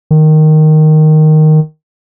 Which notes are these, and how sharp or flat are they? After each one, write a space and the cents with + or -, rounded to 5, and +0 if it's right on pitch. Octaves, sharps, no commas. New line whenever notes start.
D#3 -5